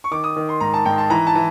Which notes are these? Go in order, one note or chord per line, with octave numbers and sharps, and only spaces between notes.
C#6
D#3 D6
D#6
D#3
C6
G#2 A#5
A5
G#2 G5
A5
E3 A#5
A5
E3